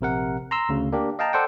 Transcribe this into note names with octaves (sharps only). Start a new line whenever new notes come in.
A#1 C3 A#4 F#5
A#5 C6 E6
D2 C#3
A#3 D4 G4 A#4
D#5 F5 G5 A5 A#5
A4 C5 D5 F#5 G5